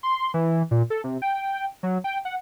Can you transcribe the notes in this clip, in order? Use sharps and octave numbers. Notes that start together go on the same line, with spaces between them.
C6
E3
A#2
A4
C3
G5
F#3
G5
F#5